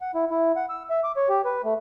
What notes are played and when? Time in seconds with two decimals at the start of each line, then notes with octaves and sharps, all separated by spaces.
0.01 F#5
0.15 E4
0.31 E4
0.56 F#5
0.70 E6
0.90 E5
1.04 D6
1.17 C#5
1.29 G4
1.45 B4
1.64 A3